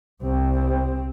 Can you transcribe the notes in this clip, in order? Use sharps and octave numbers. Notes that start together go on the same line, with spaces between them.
C2 C4